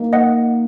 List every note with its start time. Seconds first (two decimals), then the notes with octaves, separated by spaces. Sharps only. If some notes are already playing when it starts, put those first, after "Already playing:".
Already playing: A#3 D#4 A#4
0.13 D#5 F#5